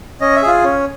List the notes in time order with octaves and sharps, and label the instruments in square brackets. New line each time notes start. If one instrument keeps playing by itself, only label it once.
[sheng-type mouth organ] C#4 D#5
E5
F4 G#4
C#4